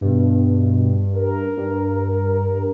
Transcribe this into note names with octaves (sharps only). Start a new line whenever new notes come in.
G2 B2
A#4
G2